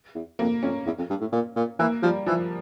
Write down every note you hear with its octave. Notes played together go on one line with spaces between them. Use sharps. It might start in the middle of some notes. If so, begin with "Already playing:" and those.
E2
F2 A#3
F2 C#4
E2
F2
G2
A2
A#2
A#2
E3 A#3
F3 G3
E3 F3